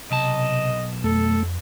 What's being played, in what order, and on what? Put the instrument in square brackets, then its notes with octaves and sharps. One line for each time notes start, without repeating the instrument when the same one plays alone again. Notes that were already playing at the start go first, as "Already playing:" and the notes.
[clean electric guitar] B1 A5 [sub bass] C3 [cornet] D#5
[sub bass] F2 [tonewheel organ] A3 [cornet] A4